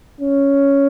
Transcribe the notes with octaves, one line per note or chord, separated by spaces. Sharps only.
C#4